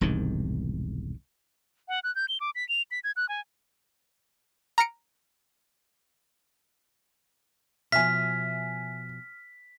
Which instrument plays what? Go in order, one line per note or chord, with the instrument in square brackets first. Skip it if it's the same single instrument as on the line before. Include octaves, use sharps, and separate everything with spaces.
[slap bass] E1 C2 G#2 D#3
[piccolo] F#5
F#6
G6
G7
D6
B6
F7
B6
G#6
F#6
G#5
[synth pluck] A#5 F6 A#6 C#7 D7
[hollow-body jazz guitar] B2 F3 [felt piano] E5 G#5 [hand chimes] F6 [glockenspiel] B6